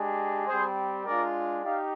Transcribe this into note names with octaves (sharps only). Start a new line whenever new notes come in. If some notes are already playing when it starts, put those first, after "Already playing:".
Already playing: G#3 D4 G4
G3 C4 G4 G#4 C5
G#3 D4 F4 A#4 D5
D#4 G4 D5 F5